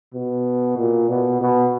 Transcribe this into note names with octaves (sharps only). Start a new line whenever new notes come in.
B2
A#2
B2
B2